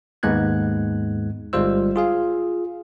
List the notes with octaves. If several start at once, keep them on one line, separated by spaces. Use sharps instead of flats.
D#2 G#2 G#3 B3 F#6 G#6
G1 G3 G#3 F4 C5 E6
F4 G#4 F5